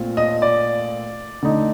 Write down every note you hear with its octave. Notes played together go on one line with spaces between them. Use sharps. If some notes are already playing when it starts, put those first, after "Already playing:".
Already playing: A#2 A3 C4 F4
D#5
D5
D3 A3 D#4